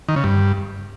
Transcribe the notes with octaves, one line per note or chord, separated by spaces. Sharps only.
D#3
C#3
G2